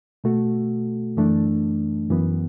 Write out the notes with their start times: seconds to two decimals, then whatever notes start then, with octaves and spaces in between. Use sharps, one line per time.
0.24 B2 A3 F#4 A4
1.17 F#2 E3 A3 D4
2.10 F#2 E3 B3